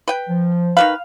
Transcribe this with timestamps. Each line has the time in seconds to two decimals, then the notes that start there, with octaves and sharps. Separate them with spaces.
0.08 B4 G5
0.29 F3
0.77 D#3 G3 B4 F5